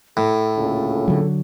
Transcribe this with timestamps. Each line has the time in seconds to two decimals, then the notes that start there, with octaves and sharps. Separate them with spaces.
0.17 A2 A4
0.56 D2 A#2 C#3
1.08 D3 F#3